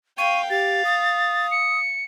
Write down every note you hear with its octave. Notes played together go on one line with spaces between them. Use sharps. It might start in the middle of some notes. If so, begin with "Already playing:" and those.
F5 G5 C#6 D#7
G4 F5 A6
D#6
C#7